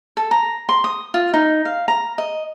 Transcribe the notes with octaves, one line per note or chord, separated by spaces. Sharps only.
A4
A#5
C6
D#6
F4
D#4
F5
A#5
D#5